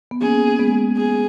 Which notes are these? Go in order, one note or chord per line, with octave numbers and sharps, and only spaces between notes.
B3
A#3 C#4 G#4
G#3 B3
G#4